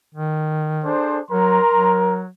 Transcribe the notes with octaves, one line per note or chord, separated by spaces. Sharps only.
D#3
D4 G#4 A4 C5
F#3 A#4 A#5 C6
F#3